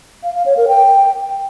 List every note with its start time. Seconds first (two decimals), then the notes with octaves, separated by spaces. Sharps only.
0.23 F5
0.35 F5
0.46 C#5
0.57 A#4
0.68 G5